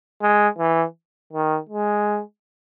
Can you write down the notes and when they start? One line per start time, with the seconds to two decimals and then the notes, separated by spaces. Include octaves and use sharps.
0.22 G#3
0.58 E3
1.33 D#3
1.69 G#3